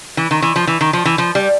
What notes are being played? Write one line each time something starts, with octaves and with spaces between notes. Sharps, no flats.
E3
D#3
E3
F3
E3
D#3
F3
E3
F3
G3